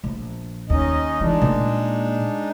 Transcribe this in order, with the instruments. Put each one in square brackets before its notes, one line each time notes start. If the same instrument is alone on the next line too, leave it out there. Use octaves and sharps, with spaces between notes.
[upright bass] A#1
[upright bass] D#2 [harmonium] C#4 D#4 D#5
[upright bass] E3 [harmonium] G#3 D4 D#4
[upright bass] A#2